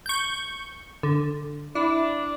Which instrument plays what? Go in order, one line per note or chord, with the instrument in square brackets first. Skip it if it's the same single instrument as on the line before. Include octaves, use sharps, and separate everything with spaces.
[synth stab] C#6 G6
D3
[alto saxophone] D4 [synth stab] E4